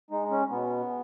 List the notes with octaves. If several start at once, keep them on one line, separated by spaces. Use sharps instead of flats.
G#3 D#4
C#4
B2 B3